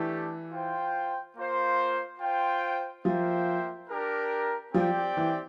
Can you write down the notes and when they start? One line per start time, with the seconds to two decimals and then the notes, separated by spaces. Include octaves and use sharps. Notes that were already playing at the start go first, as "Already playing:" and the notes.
Already playing: E3 A3 D4 G4
0.51 F4 C5 G5
1.36 A#3 F4 C5
2.20 F4 C5 G5
3.05 F3 A#3 F4 C5 E5 G5
3.90 D4 G4 A#4
4.74 F3 C4 G4 D5 G5
5.17 E3